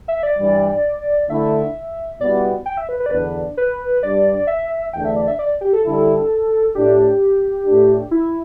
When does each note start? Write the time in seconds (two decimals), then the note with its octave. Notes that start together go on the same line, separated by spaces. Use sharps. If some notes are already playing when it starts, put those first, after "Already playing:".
0.08 E5
0.23 D5
0.38 G2 E3 G3
1.30 D3 A3 E4 E5
2.20 B2 G3 B3 E4 D5
2.66 G5
2.77 E5
2.89 B4
3.00 B4
3.06 D5
3.11 E2 D3 B3 D4 B4
3.57 B4
4.02 G2 G3 D4 D5
4.47 E5
4.93 E2 D3 A3 D4 G5
5.05 E5
5.16 D5
5.28 E5
5.39 D5
5.61 G4
5.73 A4
5.85 D3 G3 E4
6.75 A2 A3 D4 G4
7.66 A2 A3 D4
8.11 E4